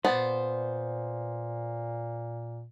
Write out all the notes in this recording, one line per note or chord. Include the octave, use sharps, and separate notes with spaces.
A#2 B3 C5 D5